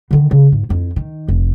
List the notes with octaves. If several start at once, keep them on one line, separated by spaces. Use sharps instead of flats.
D3 D#3
C#3
G#2
F2 E4
D#3
F1